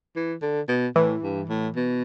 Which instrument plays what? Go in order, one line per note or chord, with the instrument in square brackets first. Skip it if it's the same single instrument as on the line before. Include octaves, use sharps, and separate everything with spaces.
[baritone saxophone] E3
D3
B2
[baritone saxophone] A2 [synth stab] E3
[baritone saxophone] G2
A2
B2